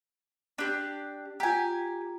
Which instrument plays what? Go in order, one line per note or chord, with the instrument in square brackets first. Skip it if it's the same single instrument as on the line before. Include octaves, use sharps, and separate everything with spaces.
[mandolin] D4 G4
[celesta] F4 A#5 [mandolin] G4 G#5